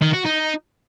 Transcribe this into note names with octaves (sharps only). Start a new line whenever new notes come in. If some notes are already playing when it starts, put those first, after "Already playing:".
D#3
F#4
D#4